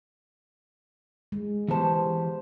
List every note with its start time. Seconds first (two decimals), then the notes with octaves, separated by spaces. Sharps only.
1.32 G#3
1.69 E3 B3 G4 C5 A5